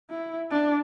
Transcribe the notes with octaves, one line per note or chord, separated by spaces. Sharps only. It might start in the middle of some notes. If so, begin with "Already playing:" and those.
E4
D4